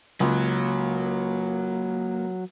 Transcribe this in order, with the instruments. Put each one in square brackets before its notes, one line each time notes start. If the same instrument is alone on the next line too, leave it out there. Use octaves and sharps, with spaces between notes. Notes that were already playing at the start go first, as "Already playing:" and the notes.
[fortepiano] C#2 [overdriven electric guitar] F#3 [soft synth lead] A#3